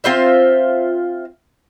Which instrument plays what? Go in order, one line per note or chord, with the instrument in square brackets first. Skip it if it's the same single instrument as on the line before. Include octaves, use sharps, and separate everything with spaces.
[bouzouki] C4 F4 C5 E5